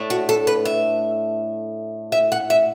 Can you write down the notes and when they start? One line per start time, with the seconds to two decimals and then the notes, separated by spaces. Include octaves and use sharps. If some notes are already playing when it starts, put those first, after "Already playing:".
Already playing: A2 A3 D4
0.10 F#4
0.29 A4
0.47 B4
0.65 E5
2.12 E5
2.32 F#5
2.50 E5